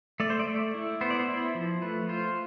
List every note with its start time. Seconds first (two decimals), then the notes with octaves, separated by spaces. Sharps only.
0.20 A3 D5
0.30 C5
0.40 D5
0.47 A3
0.74 E4
1.01 B3 C5
1.10 D5
1.19 C5
1.29 E4
1.55 F3
1.82 A3 B4
2.09 F4 C5